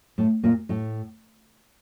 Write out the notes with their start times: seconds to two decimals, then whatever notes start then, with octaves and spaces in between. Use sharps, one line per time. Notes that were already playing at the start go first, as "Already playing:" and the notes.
0.18 A2 A3
0.43 A#2 A#3
0.69 A2 A3